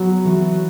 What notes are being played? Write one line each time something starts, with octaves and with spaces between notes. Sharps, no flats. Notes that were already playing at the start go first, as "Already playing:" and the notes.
Already playing: F#3 B3 F#4
E3 B3 F#4